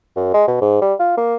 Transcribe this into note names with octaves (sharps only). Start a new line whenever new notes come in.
F#2
G#3
B2
G#2
G3
F4
A#3